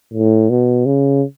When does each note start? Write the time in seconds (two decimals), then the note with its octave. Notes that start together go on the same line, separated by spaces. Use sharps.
0.14 A2
0.50 B2
0.86 C#3